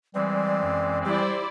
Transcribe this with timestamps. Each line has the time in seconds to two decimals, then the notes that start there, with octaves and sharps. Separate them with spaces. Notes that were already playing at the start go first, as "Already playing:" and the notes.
0.15 E3 G3 G#3 C4 D5
0.63 F#2
1.05 G3 E4 G4 C5 D5